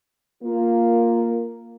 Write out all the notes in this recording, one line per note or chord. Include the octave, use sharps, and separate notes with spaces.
A#3 F4